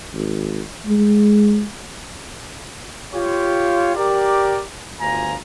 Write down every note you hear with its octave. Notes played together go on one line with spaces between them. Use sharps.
G#1
G#3
F4 G4 C#5
G4 A#4 D5
G1 D2 F4 G#5 A#5